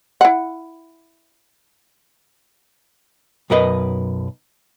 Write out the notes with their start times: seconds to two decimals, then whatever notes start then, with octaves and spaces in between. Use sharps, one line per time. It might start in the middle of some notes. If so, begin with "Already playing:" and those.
0.21 E4 F#5
3.50 B1 F#2 A#4 B4 D#5